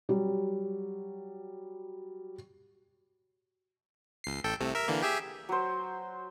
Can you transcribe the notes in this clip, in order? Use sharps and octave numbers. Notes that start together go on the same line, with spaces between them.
F#3 G3
C#2 C7
A1 A4 G5
C2 C3 A3
A#4 E5
D3 E3 A#3
G4 G#4 E5
F#3 C5